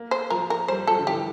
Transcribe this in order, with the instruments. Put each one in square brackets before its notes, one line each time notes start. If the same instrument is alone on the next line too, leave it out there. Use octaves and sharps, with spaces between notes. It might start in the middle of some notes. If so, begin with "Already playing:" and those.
Already playing: [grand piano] A#3
[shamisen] C5
[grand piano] F3 [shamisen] A#4
[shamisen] A#4
[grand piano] G3 [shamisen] C5
[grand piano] F3 [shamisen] A4
[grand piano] D3
[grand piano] E3 [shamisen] G4